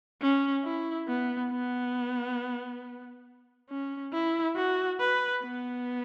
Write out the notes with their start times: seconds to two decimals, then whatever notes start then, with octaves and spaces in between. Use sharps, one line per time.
0.21 C#4
0.64 E4
1.08 B3
1.51 B3
3.70 C#4
4.12 E4
4.56 F#4
5.00 B4
5.43 B3